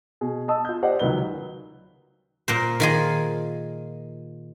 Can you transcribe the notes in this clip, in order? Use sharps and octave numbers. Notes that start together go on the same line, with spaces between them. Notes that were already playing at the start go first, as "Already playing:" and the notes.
B2 G#4
D#5 A5 D#6 E6
F4 G6
G4 C5 D5 D#5 F#5
C#2 D#3 F#3 B4 G7
A#2 A#4 C5
D#3 F4 G#4